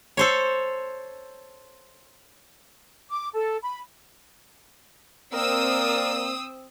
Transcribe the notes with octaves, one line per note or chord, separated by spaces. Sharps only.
A4 C5 C#5
D6
A4
B5
A#3 C4 A#4 D5 D#6 E6